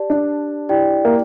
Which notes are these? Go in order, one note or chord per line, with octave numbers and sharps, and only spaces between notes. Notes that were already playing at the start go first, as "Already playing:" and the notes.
Already playing: G4 D5 A5
D4
E4 G4 D5 G5
A#3